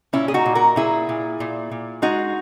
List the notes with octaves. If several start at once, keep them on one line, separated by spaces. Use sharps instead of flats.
A#2 C#4 E4
G#4
D#4 F#4
A#2
F#4 A#4
A#2 E4 G#4
A#2
A#2
A#2
G#3 D#4 F#4